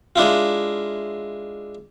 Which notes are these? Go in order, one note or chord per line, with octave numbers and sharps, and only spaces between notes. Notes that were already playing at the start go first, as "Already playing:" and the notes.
G#3 D4 E4 F4